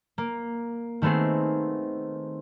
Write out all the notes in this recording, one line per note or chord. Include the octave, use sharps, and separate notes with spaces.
A#3
D#3 A3 B3 C4 G#4